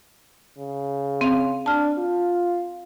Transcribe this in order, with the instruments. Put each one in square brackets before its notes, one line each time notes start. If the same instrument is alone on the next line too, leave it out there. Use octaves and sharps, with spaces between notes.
[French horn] C#3
[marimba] C4 F5
[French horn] D4 [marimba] A5 F6
[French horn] F4